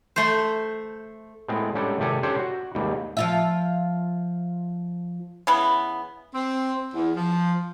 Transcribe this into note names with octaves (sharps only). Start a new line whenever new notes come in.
A3 C5
A2 G#3 B3 C4
G#2 G3 C#4 D4 A4 G5
G#1 C3 G4 A4 G#5
C#4 D4 G4 A4 C5 C#5
F#4
D#2 G#2 G3
F3 F4 E5
C#3 E3 B3
C4
E2
F3